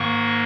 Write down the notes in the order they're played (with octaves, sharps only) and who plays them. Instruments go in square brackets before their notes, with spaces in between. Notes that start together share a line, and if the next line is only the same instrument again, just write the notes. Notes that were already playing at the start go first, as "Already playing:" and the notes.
Already playing: [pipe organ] G#2 D#3 A#3 C#6